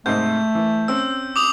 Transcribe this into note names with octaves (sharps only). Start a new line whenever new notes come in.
G#2 C3 A3 D#5 G6
E3
C4 C#4 E6
D6 D#6 F7